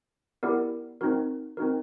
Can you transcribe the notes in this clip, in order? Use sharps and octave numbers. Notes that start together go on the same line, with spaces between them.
B3 E4 G4 A#4 D5
C4 D#4 F#4 A#4
C4 D#4 F#4 A#4